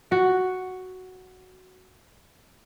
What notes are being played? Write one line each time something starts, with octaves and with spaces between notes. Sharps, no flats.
F#4 F#5